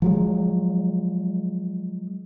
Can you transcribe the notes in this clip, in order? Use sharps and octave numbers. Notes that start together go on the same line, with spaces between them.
F3 F#3 G#3